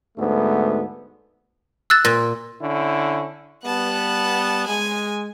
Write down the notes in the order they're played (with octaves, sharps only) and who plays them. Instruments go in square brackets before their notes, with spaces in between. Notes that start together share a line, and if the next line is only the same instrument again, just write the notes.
[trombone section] D2 G#2 A3 B3
[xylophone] E6 F#6 A6
[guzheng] A#2
[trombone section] D3 C#4 E4
[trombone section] G3 B3 [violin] A5 F#6
[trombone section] G#3 [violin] G#5